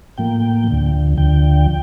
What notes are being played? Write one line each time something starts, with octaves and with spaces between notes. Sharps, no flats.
A2 F3 A#3 G5
D2 D3 F3
D2 D3 F3 G5